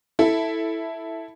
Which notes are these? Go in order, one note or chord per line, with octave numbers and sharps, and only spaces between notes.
E4 A4